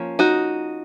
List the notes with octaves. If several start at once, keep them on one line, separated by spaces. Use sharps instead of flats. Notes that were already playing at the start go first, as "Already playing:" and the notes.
Already playing: F3 A#3 C#4
D#4 F#4